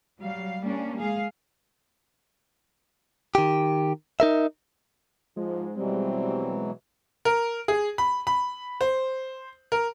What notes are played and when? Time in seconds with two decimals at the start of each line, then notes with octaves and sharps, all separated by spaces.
0.20 F#3 G3 F5
0.62 G3 A#3 C#4 D4
0.98 G#3 G#4 F5
3.35 D#3 G4
4.20 D#4 A#4 E5
5.37 G#2 F3 G#3
5.77 B2 E3 F#3 G3 C4
7.25 A#4
7.68 G#4
7.98 B5
8.27 B5
8.81 C5
9.72 A#4